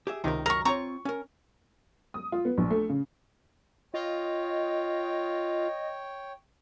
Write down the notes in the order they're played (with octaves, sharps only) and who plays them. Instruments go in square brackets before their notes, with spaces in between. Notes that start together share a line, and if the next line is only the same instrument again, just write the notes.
[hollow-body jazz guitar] G4 G#4 E5
[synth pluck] C#2 C3 D#3 [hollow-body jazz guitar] D#4 A#4
[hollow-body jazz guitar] F#2 A#5 [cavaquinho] A#4 C#6
[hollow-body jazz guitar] C4 F4 C#5 [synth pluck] A#5 [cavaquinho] C#6
[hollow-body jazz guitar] C#4 A#4
[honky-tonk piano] D#6
F4
B3
A#1
A3
C#3
[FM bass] F4 [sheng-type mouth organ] C#5 G5 [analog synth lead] D#5